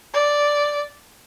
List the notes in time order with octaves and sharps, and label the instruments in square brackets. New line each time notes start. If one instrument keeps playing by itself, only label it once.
[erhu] D5